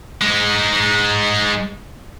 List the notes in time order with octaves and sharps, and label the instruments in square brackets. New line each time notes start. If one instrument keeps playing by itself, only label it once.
[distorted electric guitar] G#3 D#4